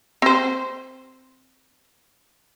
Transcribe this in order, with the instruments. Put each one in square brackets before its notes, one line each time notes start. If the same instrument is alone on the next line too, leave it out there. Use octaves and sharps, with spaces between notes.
[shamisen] C4 C5